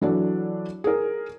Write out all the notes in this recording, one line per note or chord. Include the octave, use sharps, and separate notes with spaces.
E3 F#3 D4 A4 D5
G#4 A#4